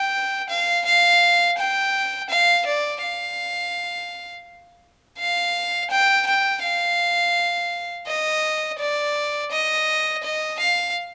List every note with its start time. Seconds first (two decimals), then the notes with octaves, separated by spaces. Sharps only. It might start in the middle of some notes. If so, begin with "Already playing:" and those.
Already playing: G5
0.50 F5
0.85 F5
1.58 G5
2.30 F5
2.66 D5
3.02 F5
5.18 F5
5.90 G5
6.26 G5
6.62 F5
8.07 D#5
8.79 D5
9.51 D#5
10.23 D#5
10.59 F5